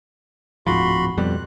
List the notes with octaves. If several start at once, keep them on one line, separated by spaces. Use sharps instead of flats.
D1 G#2 F3 F#4 B5 C6
F2 B2 G3 F#6